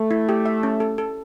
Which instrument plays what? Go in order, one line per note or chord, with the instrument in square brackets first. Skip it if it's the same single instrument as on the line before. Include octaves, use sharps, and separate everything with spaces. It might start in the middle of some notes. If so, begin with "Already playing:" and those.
Already playing: [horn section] A3
[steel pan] E4
G4
E5
C#4
A4
A4